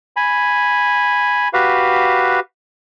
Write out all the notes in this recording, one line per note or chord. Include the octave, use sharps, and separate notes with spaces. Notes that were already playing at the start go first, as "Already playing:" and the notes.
G#5 B5
F#4 G4 B4 F5